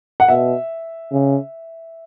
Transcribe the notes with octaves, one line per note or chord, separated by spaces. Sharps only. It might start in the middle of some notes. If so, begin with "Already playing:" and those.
F#5
B2 E5
C#3